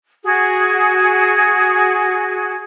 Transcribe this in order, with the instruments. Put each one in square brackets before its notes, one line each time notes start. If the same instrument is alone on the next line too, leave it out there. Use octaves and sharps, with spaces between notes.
[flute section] F#4 G#4